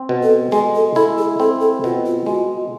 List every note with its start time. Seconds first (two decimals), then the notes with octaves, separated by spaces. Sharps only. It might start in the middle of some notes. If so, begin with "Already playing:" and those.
Already playing: C4
0.09 B2
0.23 A4
0.52 G#3 G#4
0.75 A4
0.96 E4 A4
1.18 G#4
1.40 C4 A4
1.61 A4
1.84 B2 F4
2.06 F4
2.26 G#3 F#4